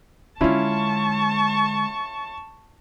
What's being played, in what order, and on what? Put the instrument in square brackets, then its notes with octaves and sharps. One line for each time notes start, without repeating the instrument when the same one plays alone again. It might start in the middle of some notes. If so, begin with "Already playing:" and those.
[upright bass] D3 G#3 [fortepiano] C#4 E4 F4 [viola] A5 C#6